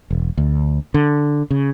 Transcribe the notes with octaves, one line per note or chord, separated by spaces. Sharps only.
E1
D2
D3
C#3